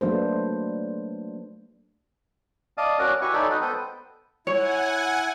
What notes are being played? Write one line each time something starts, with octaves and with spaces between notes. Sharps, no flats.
F#3 A3 A#3 D4 B4 C5
D5 D#5 F5 A5 D#6
C#4 F#4 A#4 D5 F#5 A#5
E4 F#4 G4 B4 G#5 C#6
D#4 A4 C#5 D5 G#5 B5
D#4 F#4 B4 D#5
B3 A4 B4 C5 G5 D#6
E4 C#5 F#5 G#5